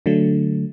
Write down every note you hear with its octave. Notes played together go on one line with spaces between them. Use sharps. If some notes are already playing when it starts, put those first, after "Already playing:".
D3 F#3 A3